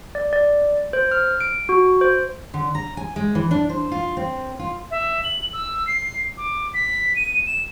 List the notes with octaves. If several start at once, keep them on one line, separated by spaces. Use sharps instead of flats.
D5
D5
C5
F6
D7
F#4
C5
D3
A#5
G#5
G#3
E3
D4
C5
F4
C4
F4
E5
F#7
E6
C7
D6
B6
D#7
E7